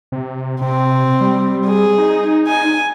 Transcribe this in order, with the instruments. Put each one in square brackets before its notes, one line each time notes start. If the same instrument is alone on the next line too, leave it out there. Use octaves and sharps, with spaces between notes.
[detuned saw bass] C3
[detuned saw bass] C3 [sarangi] C4
[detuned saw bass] G3
[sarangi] G#4
[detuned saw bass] D#4
[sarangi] G#5